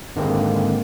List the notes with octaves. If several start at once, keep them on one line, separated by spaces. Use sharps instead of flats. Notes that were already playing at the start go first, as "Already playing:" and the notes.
G#1 D3 D#3 G#3 A#3 C4